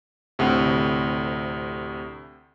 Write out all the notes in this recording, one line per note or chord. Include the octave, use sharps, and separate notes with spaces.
D2 A2 C3